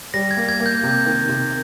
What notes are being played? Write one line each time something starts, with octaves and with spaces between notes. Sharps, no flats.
G3 A#6
G#6
A#3
G#6
A#3
G6
C3
D#3
C3